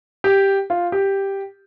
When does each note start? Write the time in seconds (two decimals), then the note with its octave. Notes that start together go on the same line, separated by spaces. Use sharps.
0.24 G4
0.70 F4
0.92 G4